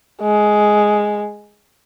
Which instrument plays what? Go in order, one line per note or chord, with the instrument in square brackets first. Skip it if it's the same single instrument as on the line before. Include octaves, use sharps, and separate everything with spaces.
[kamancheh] G#3